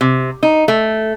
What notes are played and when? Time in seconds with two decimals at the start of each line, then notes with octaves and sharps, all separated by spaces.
0.01 C3
0.43 D#4
0.68 A3